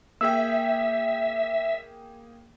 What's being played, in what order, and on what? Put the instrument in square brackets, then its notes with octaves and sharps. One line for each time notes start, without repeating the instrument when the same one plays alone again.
[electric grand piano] A#3 G#4 G5 [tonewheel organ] E5 [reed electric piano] E6